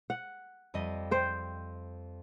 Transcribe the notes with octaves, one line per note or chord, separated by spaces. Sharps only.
F#5
F2 G3 D#5
C5 G5